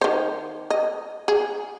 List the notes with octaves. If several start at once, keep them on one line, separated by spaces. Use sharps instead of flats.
D#3 C5
D#5
G#4